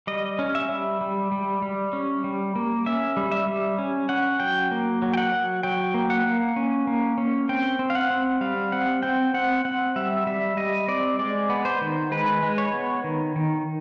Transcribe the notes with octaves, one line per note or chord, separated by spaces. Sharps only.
G3 D#5
C#4
E5
G3
G3
G3
G3
C#4
G3
A#3
C#4 E5
G3
E5
G3
C#4
C#4 F#5
F#3 G5
A#3
F#3
G5
F#5
F#3
F#3 G5
A#3
F#5
A#3
C#4
A#3
C#4
C4 G5
C4
F5
F#5
C4
G3 F5
C4 F#5
C4 G5
C4 F#5
C4 F#5
G3 E5
G3 E5
G3 D#5
C4 D5
G#3 D5
B3
C5
D#3
G#3 B4
G#3
C#5
B3
D#3
D#3